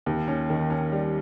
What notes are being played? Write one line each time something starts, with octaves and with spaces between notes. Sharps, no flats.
D#2
C#4
D#3
C#4
G3